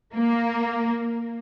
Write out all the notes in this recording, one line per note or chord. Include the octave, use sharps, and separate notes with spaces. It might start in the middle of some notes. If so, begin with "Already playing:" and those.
A#3